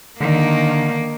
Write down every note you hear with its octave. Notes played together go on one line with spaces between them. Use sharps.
D3 D#3 A#3